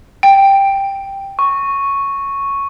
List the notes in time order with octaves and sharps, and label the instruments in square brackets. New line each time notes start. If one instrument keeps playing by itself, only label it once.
[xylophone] G5
[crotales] C#6